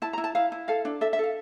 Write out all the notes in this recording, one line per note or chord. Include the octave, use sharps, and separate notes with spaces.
E4 A5
A#5
E4
A5
E4 F5
E4
A4 F5
D4
A4 E5
E5
A4 F5